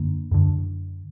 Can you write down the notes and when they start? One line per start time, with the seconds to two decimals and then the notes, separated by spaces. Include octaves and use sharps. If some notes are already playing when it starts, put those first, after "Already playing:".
Already playing: F#2 D3 A#3
0.31 F#2 D3